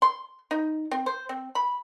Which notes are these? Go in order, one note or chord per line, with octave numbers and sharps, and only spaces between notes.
C6
D#4
C4
C5
C4
B5